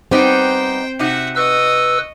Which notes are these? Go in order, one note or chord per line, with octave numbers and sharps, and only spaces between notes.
G3 B3 C4 D#4 C5 G5
C3 D#4 F#4 E5 F#5
B4 D#5 C#6 E6